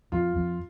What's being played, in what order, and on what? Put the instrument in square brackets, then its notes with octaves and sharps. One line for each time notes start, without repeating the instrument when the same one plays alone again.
[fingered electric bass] F2 [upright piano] F4
[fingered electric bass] F2